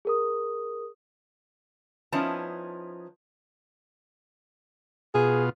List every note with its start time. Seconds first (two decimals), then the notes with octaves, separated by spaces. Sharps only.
0.05 G#4 A#4 D#6
2.12 F3 B3 C#4 D#4 E4 A5
5.15 B2 F4 G#4